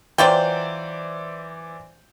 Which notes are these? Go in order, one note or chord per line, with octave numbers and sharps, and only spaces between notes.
E3 F#3 F4 C5 D5 G5